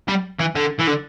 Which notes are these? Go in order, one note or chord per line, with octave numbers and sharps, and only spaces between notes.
G3
E3
D3
E3
D3